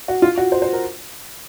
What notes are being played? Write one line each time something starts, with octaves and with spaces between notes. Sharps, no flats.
F#4
F4
F#4
C5
C5
A#4